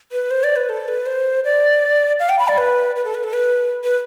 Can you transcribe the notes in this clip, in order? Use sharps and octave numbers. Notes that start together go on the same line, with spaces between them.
B4
C5
D5
B4
A4
B4
C5
D5
F5
G5
B5
D5
B4
B4
A4
B4
A4
B4
B4